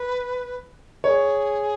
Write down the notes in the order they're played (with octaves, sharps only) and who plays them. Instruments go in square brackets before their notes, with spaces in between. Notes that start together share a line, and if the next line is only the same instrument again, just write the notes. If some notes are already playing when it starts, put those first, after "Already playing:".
Already playing: [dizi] B4
[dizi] B4 [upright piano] C#5
[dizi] G#4